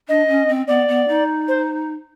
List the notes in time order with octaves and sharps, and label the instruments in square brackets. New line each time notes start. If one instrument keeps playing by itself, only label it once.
[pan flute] D4 [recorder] D#5
[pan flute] C#4
C4
[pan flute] B3 [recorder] D5
[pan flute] B3
D#4
[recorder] C5